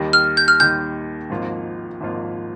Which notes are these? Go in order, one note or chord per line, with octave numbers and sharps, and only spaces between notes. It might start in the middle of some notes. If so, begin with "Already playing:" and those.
Already playing: D#2 D#3 G3
F6
G6
F6
D#2 D#3 G3 G6
G#1 G#2 F3 A#3 F4
G#1 G#2 F3 A#3 F4